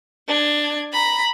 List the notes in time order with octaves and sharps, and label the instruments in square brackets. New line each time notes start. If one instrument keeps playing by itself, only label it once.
[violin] D4 G#6
A#5 B5